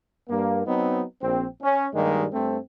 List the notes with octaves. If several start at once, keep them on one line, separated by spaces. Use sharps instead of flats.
G2 A#3
F#3 B3 C4 D#4
A#1 C4
C#4
G2 D#3 G3 G#3 A#3
G2 A3 C4